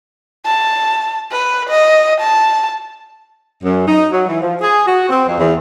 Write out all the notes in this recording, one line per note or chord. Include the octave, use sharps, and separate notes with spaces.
A5
B4
D#5
A5
F#2
D#4
F#3
E3
F3
G#4
F#4
C4
F2
E2